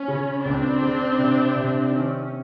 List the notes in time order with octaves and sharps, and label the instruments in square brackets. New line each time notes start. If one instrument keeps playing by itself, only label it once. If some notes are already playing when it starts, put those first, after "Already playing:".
Already playing: [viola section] C#4
[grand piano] C#3
[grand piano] C#2 [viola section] C4 D4
[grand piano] C#3
C3
C3
[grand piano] D#3 [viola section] C#4